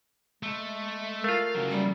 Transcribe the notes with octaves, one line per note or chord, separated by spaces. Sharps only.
G#3 A3
A3 F4 A#4 F5
C#3 F#3
G3